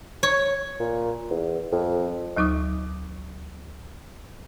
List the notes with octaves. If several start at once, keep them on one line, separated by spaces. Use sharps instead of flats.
C#5
A#2
E2
F2
D2 F#3 D#4 D6 D#6